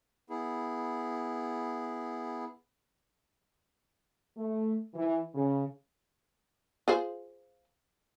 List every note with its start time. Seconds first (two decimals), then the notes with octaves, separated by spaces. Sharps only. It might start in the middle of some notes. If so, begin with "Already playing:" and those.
0.30 B3 E4 G#4
4.38 A3
4.95 E3
5.34 C#3
6.88 F4 G#4 C5